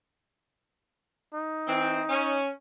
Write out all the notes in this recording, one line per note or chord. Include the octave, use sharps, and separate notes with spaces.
D#4
E3 C4
C#4